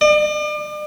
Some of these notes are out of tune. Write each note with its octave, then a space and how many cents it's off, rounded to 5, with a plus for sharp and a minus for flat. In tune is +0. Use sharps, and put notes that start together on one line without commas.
D5 +40